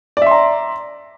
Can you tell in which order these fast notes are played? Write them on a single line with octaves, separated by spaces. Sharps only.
D5 E5 C6 A#5